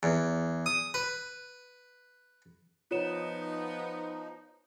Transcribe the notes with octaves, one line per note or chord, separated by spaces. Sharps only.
E2
D#6
B4
F3 B3 D#4 F4 C#5 E7